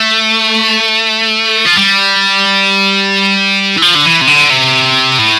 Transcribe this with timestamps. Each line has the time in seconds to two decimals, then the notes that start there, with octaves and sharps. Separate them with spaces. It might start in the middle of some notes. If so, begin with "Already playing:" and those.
Already playing: A3
1.66 F3
1.78 G3
3.77 E3
3.82 F3
3.95 D3
4.06 E3
4.21 C3
4.27 D3
4.50 C3
5.19 A2